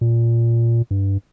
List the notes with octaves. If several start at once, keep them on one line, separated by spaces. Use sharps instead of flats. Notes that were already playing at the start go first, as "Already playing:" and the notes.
A#2
G2